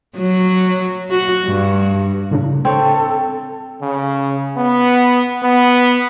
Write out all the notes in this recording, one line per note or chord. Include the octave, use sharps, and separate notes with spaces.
F#3
F#4
G2
A2 C#3 D4
C4 A4 C#5
C#3
B3
B3